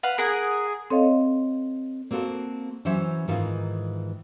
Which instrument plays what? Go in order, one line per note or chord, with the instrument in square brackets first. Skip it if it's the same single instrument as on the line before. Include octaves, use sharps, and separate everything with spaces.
[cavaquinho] B4 F5 F#5
[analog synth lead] G#4 [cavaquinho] A#4 F#5
[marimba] C4 A4 C#5 D#5 F5
[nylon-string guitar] A#3 C4 F#4 A4 C5
E3 F#3 C#4 C5 E5
G#2 D#3 E3 G#3 D#4 F4